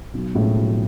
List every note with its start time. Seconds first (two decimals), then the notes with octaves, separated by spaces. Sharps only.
0.14 B1
0.35 A2 F3 G#3
0.55 B1